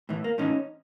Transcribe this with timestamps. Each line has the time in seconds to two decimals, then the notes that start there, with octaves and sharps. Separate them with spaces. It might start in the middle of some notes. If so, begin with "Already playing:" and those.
0.09 A2 E3
0.24 A#3
0.38 A2 E3 C#4 D#4